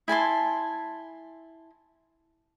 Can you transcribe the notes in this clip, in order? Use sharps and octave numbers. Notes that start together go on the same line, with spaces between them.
E4 G#5 A5 C6